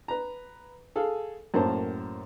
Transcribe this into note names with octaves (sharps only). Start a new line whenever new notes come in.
B4 A#5
G#4 A4 F5
F#2 A2 A#3 C5 A5